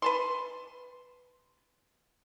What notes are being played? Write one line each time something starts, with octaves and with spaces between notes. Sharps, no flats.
B4 A5 C6